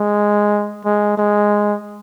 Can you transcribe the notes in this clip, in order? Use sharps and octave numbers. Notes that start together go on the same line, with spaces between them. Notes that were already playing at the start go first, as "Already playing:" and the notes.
Already playing: G#3
G#3
G#3